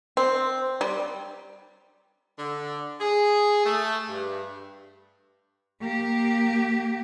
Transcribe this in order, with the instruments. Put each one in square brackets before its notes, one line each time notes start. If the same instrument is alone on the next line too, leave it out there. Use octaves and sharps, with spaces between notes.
[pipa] C4
G3
[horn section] D3
G#4
A3
G2
[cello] A#3 G4